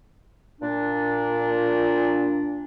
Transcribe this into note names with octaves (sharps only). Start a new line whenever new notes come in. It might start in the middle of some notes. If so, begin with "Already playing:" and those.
A#2 D4